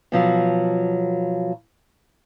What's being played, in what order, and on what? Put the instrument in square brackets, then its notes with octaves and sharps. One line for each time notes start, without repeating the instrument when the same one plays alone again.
[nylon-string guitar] B2 F3 F#3